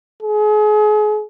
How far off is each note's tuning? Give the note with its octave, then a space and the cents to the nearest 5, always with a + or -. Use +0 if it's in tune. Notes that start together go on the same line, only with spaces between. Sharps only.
G#4 +35